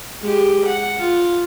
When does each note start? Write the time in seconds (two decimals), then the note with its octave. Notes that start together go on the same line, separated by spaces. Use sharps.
0.21 G#3 G4
0.67 F#5
0.99 F4